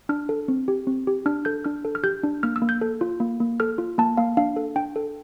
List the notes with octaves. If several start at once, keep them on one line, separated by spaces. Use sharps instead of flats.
D4 F6
A4
C4
G4
C4
G4
D4 F6
A4 G6
D4 F6
A4
F6
G4 G6
D4
A#3 F6
E6
A#3
G6
A4
F4
A#3
A#3
A4 F6
F4
A#3 A5
A#3 F5
D4 F5
A4
D4 G5
A4